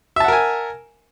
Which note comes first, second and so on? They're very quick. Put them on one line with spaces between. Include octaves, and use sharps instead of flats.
E5 A5 F#5 A#4 G#5